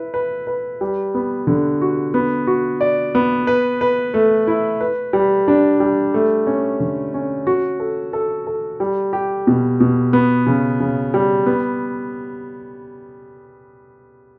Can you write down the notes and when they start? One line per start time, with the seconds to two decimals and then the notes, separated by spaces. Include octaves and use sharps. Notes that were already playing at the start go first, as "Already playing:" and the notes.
Already playing: E4 B4
0.14 B4
0.47 B4
0.81 G3
1.15 B3
1.47 D3
1.81 F#4
2.14 B3
2.47 F#4
2.81 D5
3.15 B3
3.47 B4
3.81 B4
4.14 A3
4.47 E4
4.81 B4
5.13 G3
5.48 D4
5.80 G3
6.14 A3
6.47 C#4
6.80 D3
7.14 C#4
7.47 F#4
7.80 A4
8.13 A4
8.47 A4
8.80 G3
9.13 G4
9.47 B2
9.80 B2
10.13 B3
10.47 C#3
10.80 C#3
11.14 G3
11.46 B3